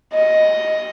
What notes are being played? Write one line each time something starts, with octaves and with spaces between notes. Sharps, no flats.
D#5